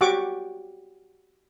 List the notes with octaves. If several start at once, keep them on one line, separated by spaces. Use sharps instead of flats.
F#4 G4 F#5 C#6 D6